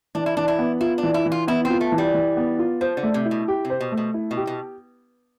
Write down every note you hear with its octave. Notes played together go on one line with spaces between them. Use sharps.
E3 D4
E4
E3 D4
E4
B3
E4 F4
D4
E3
E4
E3
F4
B3 E4
C4
F4
A3
E3
G3
E3
B3
F4
F3 C5
D3
A3
C3
E4
B2
G4
C3
C5
B2
A3
B2
E4
B2
G4
B2